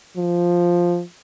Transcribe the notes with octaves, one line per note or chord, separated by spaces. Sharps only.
F3